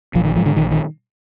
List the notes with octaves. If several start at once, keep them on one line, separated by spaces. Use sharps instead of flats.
A#1 F3
D#3
G#2 F3
D3
A#1 D#3
D#3